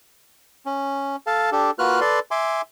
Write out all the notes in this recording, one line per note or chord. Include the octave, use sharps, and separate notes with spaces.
C#4
A4 F5 A5
D4 G4 A4
A#3 F4 F#4 B4 F6 F#6
A4 B4 D5 C6
E5 G#5 C6 D6